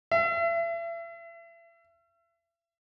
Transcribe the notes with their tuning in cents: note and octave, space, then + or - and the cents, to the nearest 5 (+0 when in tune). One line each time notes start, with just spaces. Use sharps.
E5 +35